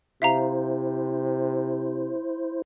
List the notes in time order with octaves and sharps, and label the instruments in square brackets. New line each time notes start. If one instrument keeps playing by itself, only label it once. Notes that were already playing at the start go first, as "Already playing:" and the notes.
[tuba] C3 [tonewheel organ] E4 C5 [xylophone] E5 F5 A#5